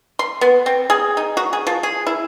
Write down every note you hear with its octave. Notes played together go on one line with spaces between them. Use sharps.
C6
B3
C4
G#4
D#4
F#4
G#4
F3
G#4
E4